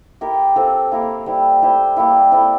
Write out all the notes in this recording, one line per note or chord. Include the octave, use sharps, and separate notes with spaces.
E4 G4 A#4
C4 F4 A4
A#3 E4 A#4 F5
G3 C4 E4
A3 E4 G4 C5
G3 A#3 E4
C4 E4 A4 D5